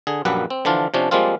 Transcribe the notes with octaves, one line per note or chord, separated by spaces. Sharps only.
D3 G#4
A#1 F#2 G3 A#3 B4 F#5
C4
D3 E3 F3 D4 F4
C3 F3 C#4 D4
F3 G3 G#3 A#3 C4 F4